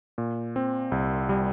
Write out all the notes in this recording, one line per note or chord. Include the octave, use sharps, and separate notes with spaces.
A#2
C4
C2
G3